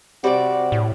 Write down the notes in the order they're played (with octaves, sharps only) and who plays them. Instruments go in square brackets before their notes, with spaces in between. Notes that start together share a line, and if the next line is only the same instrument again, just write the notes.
[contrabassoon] C3 [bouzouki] G3 C4 D5 [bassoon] F#4
[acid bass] A2